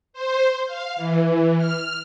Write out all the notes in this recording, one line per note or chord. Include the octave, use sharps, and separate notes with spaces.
C5
F5
E3
F6